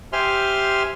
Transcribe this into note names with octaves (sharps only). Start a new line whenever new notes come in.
G4 C5 E5 G#5 C6 F6